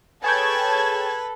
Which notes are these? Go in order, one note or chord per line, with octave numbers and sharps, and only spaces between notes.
G#4 A4 B4 C#5 G5 A5 G#6